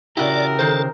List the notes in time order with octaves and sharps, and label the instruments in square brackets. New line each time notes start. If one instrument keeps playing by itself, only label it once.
[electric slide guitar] C#3 G4 [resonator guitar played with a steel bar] E4 F#4 [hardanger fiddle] A#4 [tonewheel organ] D5
[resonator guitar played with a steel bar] D#3 C5 [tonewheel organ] A4